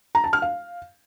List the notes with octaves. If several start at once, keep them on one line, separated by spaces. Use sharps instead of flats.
A#5
A5
F6
F5